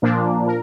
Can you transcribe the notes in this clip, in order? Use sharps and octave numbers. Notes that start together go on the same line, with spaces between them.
A#2 F3 A#3 D4
A#4